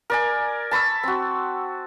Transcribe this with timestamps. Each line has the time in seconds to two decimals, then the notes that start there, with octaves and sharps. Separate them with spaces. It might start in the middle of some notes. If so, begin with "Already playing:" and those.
0.10 A#4 D5 G#5
0.71 A5 B5 C#6 E6
1.03 C4 F#4